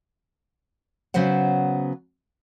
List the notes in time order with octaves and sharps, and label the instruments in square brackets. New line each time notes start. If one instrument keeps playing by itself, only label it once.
[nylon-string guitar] C#3 F#3 B3 C5 F#5